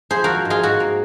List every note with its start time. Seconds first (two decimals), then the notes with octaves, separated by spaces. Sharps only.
0.10 F3 G#4 C5
0.24 F3 F#4 A#4
0.45 G#2
0.50 F4 G#4
0.63 G#2 F#4
0.80 A#3